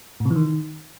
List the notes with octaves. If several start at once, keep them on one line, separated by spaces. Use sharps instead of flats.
A2
C3
E3
D#3